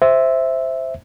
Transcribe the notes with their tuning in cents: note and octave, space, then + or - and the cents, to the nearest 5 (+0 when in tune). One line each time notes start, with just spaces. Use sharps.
C5 +0 E5 +0